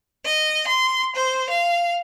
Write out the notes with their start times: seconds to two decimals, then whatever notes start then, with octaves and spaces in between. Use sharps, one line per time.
0.24 D#5
0.67 C6
1.15 C5
1.49 F5